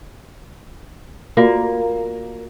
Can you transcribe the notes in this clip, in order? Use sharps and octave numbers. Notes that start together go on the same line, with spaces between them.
A#3 F4 F#4 D5